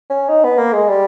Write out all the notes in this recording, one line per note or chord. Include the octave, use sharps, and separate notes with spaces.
C#4
D#4
B3
A#3
G#3
G3